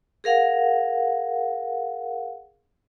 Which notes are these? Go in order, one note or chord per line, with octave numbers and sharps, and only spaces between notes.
G#4 A#4 F5 F#5